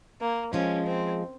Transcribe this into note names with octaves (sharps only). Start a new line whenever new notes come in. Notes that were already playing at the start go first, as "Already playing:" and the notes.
A#3
F3 G#3 C#4
C4